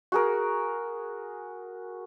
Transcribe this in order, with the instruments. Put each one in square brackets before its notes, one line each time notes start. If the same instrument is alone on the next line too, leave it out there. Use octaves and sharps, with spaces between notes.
[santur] F#4 G#4 A#4